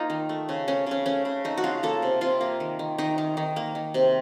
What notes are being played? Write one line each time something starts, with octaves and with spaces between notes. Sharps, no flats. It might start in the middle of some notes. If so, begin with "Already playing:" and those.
Already playing: A#3 D#4 F4
D#3
A3
C#3
A3 C#4
C#3 C#4
A3 C#4
C#3
A3 D#4
F#4
C#3 F4
A#3 A4
C3
C3 F4
A#3
D#3
D#3
D#3 D#4
D#3
D#3
A#3
D#3
C3